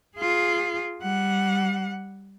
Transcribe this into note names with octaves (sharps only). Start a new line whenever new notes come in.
F4 G#4
G3 F#5